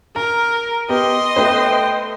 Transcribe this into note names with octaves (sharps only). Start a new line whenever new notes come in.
A#4 A#5
B3 G4 D#5 C6
A3 B4 C5 G5